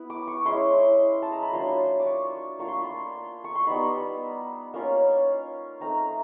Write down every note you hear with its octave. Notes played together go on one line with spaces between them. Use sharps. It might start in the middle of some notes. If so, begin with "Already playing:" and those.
Already playing: B3 E4
D6
C#6
G#3 C#4 E4 C6
A5
A#5
B5
F#3 A#3 D4 F4 C6
D6
C#6
A#3 D4 F4 C#6
C6
B5
C6
C#6
C6
G3 B3 D#4 B5
A#3 C#4 F4
A3 C4 D#4 A#5